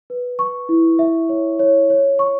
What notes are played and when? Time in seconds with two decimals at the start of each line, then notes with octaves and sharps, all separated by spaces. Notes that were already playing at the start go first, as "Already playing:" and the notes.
0.10 B4
0.39 C#6
0.69 E4
0.99 E5
1.29 C#5
1.59 C#5
1.90 C#5
2.19 C#6